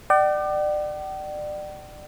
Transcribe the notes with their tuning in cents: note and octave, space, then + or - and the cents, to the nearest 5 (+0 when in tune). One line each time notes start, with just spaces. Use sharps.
D5 +30 G5 -45